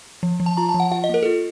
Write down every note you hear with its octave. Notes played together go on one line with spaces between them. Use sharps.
F3
F3
A5
F4 A#5
A5
F3
F#5
F4 F#5
D#5
A#3 A#4
A4
F4